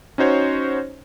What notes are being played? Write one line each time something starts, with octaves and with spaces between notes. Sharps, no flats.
C#4 D#4 F#4 C5 C#5